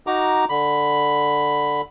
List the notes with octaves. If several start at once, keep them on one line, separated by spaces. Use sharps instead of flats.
D#4 F#4 A#5 D6
D3 B5